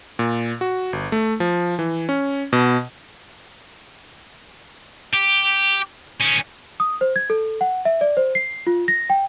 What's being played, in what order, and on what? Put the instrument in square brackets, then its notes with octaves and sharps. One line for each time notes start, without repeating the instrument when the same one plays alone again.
[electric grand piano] A#2
F#4
G1
A3
F3
E3
C#4
B2
[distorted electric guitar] G4
D#3 C#4
[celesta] D#6
C5
G#6
A4
F#5
E5
D5
C5
C7
F4
A#6
G5